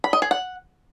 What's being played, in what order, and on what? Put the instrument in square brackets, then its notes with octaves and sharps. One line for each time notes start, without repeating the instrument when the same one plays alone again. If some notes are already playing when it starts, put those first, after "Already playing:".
[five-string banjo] B5
D#5
G#4
F#5